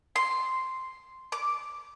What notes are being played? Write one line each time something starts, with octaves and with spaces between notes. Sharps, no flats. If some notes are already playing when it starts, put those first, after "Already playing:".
C6
D6